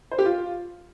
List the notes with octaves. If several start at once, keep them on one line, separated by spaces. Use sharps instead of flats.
C5
G4
F4